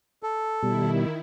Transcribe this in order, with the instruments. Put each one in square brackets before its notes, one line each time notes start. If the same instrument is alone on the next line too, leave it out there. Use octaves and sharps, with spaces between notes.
[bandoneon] A4
[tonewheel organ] B2 G3 [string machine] D#3 E4